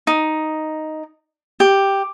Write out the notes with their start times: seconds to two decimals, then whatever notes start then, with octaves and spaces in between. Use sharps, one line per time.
0.07 D#4
1.60 G4